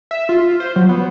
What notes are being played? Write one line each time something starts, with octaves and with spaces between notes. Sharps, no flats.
E5
F4
C5
F#3
B3